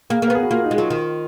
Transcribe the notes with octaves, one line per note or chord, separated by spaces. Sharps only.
A#3 G#4
A#3
B3 A#4
G#4
F#4
A#3 F4
D#4
G#3
F#3 F4
D#3